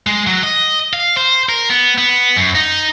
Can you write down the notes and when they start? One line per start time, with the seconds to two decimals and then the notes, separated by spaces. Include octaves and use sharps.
0.07 G#3
0.27 F#3
0.43 D#5
0.93 F5
1.17 C5
1.49 A#4
1.70 B3
1.98 B3
2.36 F#2
2.55 D#4